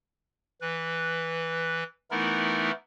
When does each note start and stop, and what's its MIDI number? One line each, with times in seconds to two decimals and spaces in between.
0.61 1.83 52
0.61 1.83 71
2.11 2.71 52
2.11 2.71 57
2.11 2.71 59
2.11 2.71 63
2.11 2.71 64
2.11 2.71 70